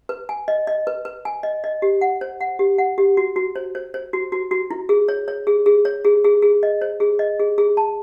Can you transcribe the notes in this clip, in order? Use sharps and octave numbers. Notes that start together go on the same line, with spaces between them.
B4
G#5
D#5
D#5
B4
B4
G#5
D#5
D#5
G4
F#5
C5
F#5
G4
F#5
G4
F#4
F#4
C5
C5
C5
F#4
F#4
F#4
E4
G#4
C#5
C#5
G#4
G#4
C#5
G#4
G#4
G#4
D#5
C5
G#4
D#5
G#4
G#4
A5